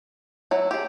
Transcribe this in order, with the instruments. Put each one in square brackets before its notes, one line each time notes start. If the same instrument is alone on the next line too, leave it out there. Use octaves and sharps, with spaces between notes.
[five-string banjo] F#3 E4 [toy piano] C#5
[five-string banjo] G4 G#4